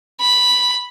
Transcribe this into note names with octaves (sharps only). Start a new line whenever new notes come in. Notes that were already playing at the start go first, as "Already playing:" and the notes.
B5